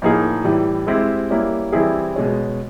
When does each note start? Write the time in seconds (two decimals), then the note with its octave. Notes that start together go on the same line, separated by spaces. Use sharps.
0.02 A2 F3 A#3 D#4 G#4
0.44 A2 E3 G3
0.87 G#3 C4 E4 G4
1.30 G3 A#3 C#4 E4
1.73 E3 G3 C4 E4 G#4
2.16 B2 G#3 C#4